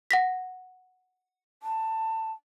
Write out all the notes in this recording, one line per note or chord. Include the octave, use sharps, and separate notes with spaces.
F#5 A#6 B6
A5